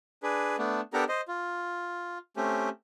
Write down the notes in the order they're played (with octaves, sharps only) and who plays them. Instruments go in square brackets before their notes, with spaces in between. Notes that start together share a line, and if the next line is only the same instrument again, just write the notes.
[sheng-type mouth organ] D4 G#4 B4
A3 B3 D4
B3 D4 G4 A4 A#4 A#5
C5 D#5
F4
A3 C4 C#4 G4